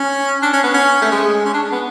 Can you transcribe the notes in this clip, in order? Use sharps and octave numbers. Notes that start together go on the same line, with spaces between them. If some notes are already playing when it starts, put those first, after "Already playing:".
Already playing: C#4
D4
C#4
B3
C#4
A3
G#3
C#4
D4
B3